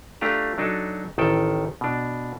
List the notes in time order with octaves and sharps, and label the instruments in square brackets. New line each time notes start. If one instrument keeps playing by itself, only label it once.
[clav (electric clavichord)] A3 D4 F4 G4 A#5
F#3 D4 D#4 A4
A1 D#3 A4 G5
B2 D4